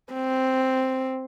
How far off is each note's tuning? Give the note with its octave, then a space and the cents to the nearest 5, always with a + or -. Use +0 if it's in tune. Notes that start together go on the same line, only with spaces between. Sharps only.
C4 +0